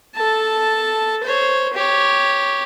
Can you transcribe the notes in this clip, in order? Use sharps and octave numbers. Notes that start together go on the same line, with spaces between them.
A4 A5
C5 C#5
G4 C#5